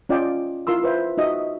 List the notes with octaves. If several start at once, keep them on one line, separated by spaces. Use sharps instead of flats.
C#4 F4 D5 D#5 G5
E4 F4 A#4 C6 E6
B4 C5 E5
D#4 F#4 D#5 E5